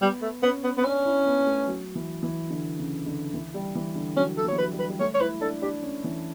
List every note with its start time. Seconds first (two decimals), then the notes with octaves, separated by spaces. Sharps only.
0.01 G3 B3
0.22 A3
0.43 B3 C#4
0.64 B3
0.78 B3
0.84 C#4 D4
1.05 E4
1.26 B3
1.41 B3
1.47 A3
1.67 F#3
1.95 E3
2.23 E3
2.50 D3
2.79 C#3
3.06 D3
3.34 E3
3.54 G3
3.75 E3
3.96 D3
4.17 F#3 C#4
4.37 A4
4.44 F#3
4.48 E3 C#5
4.58 F#3 B4
4.72 G3
4.79 B4
4.89 G3
5.00 A3 C#5
5.14 C#5
5.20 E4 B4
5.41 D4 A4
5.62 D4 G4
5.82 C#4
6.04 E3